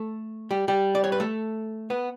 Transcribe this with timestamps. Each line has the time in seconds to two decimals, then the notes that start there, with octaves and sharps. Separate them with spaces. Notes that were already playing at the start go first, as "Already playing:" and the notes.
Already playing: A3 A4
0.51 G3 G4
0.68 G3 G4
0.95 D5
1.04 C#5
1.12 B4
1.20 A3 A4
1.90 B3 B4